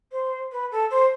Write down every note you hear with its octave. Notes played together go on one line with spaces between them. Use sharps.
C5
B4
A4
C5